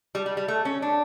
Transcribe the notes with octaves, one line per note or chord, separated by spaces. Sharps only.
G3
G3
G3
A3
C#4
D4